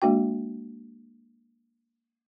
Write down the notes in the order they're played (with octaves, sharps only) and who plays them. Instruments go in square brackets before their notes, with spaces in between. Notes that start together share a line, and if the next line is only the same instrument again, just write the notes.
[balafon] G#3 A#3 D4 F#4 G5